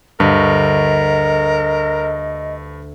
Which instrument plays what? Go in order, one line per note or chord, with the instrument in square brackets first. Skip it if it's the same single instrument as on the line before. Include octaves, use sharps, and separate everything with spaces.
[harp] D2 [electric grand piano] G2 [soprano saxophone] A#4 [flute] D#5